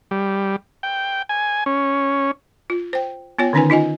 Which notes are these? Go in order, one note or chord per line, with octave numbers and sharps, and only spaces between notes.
G3
G5
G#5
C#4
F4
C5 G5
B3 F4 C#5 G5
D3 D#3 C#4 D#4 B4 G#5
D#4 F4 D#5 G#5